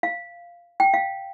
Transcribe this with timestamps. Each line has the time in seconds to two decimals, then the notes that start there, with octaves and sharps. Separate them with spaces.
0.03 F5
0.80 G5
0.94 F5